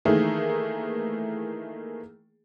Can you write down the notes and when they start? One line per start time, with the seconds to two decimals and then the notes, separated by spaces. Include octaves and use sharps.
0.05 D#3 E3 A3 A#3 G#4